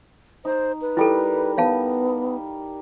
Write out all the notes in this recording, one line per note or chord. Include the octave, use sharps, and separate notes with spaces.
D#4 C5
B4
G3 E4 A4 A#4
B3 C#5 F5 A5